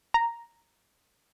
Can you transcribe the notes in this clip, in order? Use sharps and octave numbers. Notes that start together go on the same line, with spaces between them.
A#5